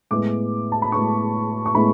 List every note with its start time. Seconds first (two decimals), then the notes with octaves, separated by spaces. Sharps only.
0.11 A2 G#3 B3 D6
0.72 A5
0.82 B5
0.92 A2 G#3 B3 C#6
1.66 C#6
1.75 A2 G#3 B3 B5